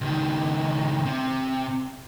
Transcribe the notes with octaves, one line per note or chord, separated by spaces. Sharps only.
C#2 D#3
C3